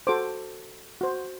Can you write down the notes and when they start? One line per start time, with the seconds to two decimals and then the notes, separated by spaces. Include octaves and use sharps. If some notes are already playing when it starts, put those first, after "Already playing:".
0.07 F#4 A4 C5 D6
1.01 F#4 C5